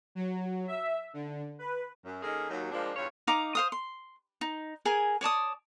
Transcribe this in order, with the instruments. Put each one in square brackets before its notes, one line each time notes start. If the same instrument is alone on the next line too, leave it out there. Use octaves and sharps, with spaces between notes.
[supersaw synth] F#3
E5
D3
B4
[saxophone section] F#2
D#3 A#3 C#4 D#4 G#4 A4
D#2 F#3
F3 G3 G#3 A#3 D4
E2 G2 F4 C#5
[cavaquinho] D#4 F5 A#5 D6
C5 F5 D#6
C6
D#4
G#4 A#4 G#5
C#5 D5 A5 D#6